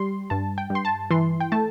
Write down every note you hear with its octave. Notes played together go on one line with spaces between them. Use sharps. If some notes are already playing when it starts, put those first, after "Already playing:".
Already playing: G3 C6
G2 A5
G5
G2
C6
A5
E3 C6
G5
A3 A5